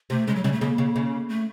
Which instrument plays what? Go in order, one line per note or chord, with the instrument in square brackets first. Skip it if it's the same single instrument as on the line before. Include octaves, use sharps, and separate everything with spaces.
[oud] C3 [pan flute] A3
[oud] C#3 [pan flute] G#3
[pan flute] F#3
[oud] C#3 [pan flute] G3
[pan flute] A3
[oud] C#3 [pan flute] A#3
[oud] C#3
C#3
[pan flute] A3